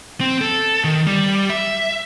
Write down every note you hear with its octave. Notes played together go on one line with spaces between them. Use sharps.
C4
A4
D#3
G3
E5